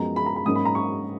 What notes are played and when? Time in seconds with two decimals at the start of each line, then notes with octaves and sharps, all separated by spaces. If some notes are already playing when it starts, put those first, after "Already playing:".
Already playing: F#2 F3 G#3 B3 A#5
0.16 B5
0.26 A#5
0.36 B5
0.45 G#2 F#3 A#3 C#4 D#6
0.55 B5
0.65 A#5
0.75 C#6